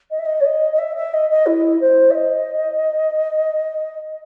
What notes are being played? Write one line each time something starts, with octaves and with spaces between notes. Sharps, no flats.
D#5
E5
D#5
C#5
D#5
D#5
E5
E5
D#5
D#5
E4
C5
E5
D#5